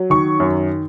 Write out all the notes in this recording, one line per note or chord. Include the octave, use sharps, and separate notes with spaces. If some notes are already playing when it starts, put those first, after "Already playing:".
Already playing: F#3
D#3 C#6
F#2